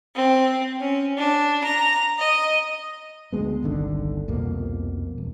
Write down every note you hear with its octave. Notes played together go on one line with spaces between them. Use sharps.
C4
C#4
D4
A#5
D#5
D2 G#3 B3
G1 C2 D3 D#3
C2 F2 B2 A#3
E1